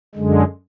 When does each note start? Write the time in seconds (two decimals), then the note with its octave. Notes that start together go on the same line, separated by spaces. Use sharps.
0.15 F#2 D3 G#3